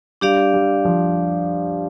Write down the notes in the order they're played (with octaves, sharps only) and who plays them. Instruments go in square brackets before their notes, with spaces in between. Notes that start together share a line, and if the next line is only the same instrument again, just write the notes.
[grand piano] G3 [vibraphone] D4 G4 D5 F5
[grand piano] G3
F3